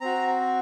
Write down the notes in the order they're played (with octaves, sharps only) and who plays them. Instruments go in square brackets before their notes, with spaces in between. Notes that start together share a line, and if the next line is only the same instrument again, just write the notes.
[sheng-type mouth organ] C4 F#4 A#5